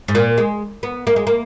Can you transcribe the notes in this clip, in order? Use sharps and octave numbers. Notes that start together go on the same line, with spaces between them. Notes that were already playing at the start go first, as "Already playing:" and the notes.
G#2
A#2
G#3
B3
A#3
G#3
A#3